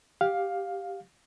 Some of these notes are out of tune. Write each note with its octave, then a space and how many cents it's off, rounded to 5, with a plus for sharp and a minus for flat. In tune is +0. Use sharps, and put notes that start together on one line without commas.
G4 +0 F5 +15